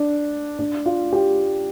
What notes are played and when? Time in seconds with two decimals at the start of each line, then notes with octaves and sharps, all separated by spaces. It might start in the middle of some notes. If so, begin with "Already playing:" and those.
Already playing: D4
0.59 D4
0.86 F4
1.13 G4